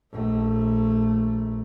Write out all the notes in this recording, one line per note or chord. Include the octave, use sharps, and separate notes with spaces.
A#1 A3